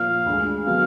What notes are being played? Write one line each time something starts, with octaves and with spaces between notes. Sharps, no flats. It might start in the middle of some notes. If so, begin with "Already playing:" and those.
Already playing: A#2 F3 A#3 F5
D2 D3 G#3
D3 F#3 B3 F5